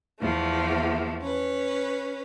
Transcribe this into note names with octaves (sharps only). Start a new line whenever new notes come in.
E2 F3 A3
C#4 B4